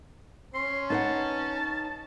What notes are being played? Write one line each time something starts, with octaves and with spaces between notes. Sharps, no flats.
C#4 C6
D#4 B4 F#5 A5